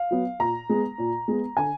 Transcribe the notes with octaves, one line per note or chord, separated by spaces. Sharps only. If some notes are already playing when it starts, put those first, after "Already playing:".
Already playing: F5
F#3 B3
A#2 A#5
G#3 B3
A#2
G#3 B3
D3 G#5